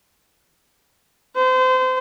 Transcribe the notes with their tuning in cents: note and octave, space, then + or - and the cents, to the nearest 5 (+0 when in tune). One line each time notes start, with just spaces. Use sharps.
C5 -30